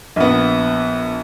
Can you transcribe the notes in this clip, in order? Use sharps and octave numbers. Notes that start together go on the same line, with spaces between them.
A#1 B3